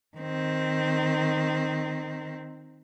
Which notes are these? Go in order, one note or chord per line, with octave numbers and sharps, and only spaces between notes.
D#3 C4